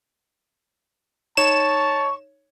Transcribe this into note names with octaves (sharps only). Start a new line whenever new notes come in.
D#4 C#5 A5 C#6 E7